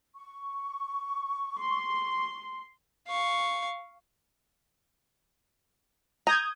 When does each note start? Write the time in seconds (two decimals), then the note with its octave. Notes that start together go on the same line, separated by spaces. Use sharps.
0.15 C#6
1.59 C6
3.08 F5 C#6
6.27 A#5 D#6 G6 G#6